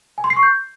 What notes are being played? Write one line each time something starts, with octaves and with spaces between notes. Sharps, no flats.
G#5
C6
C7
C#6
G6